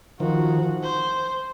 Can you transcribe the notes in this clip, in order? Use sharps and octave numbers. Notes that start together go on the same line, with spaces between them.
D#3 F3 F#4
C5